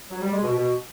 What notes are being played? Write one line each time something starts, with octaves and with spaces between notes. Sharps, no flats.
F#3
G3
G#3
B2
B2